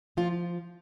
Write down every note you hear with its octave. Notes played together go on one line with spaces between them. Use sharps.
F3 F4